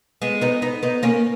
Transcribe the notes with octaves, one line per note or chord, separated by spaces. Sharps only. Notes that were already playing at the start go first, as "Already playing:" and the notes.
G#3 B3
B3 D#4
B3 D#4
B3 D#4
A#3 C#4